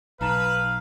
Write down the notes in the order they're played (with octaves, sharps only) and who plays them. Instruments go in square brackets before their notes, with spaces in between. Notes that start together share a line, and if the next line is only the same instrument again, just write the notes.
[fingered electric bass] B1 [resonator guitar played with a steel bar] D#4 A5 [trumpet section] B4 [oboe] F5